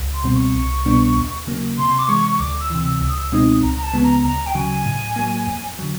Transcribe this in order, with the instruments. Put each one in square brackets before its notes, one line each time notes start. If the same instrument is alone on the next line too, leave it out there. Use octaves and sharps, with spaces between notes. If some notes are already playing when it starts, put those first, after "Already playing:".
Already playing: [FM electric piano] C#2
[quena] C6
[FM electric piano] B2 G3 C4
[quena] C#6
[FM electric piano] C2
B2 G3 B3 D4
D#2
C#3 F#3 A#3
[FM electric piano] C3 [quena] C6
[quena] D6
[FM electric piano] E3 G#3 [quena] C#6
[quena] C#6
[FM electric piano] D2 [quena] D6
[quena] E6
[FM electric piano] C3 E3
[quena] E6
[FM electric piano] C#2 [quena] E6
[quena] D#6
E6
[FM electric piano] B2 G#3 C4 D#4 [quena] D#6
[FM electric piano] C#2 [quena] A#5
[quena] A#5
A5
[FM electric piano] C#3 F3 G#3 B3
[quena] A#5
[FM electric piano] D2 [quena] A#5
[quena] G5
[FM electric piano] C#3 F#3 [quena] G#5
[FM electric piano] A2
F#3 A#3
F2
D3 F#3